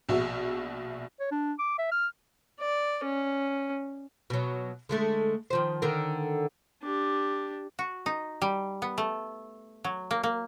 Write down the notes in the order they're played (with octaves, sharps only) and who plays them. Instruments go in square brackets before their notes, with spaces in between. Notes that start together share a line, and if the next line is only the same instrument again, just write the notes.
[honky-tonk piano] A#1 B2 F#4 E5
[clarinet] C#5
D4
D6
E5
F6
[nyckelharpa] D5
C#4
[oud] B2 F#3
D3 G#3 A3
D#3 F3 C5
D3 D#3 A#4
[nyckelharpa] D4 G4
[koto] F#4
D#4
G3
B3
A3
F#3
A#3
A#3